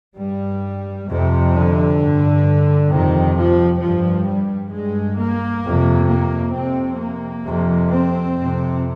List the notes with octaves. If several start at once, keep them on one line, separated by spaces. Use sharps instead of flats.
G2 G3
F2 C3
D3
G2
F2 C3 D#3
F3
G2 F3
G3
G2 G#3
A#3
F2 C3
A#3
F2 C3 C4
A#3
F2 C3
C4
F2 C3